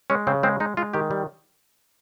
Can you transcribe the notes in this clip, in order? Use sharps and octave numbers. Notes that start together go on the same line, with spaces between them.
G#3 C#4
C#3 C4
G#3 C4
G#3 D#4
G#3 F4
D#3 G4
G3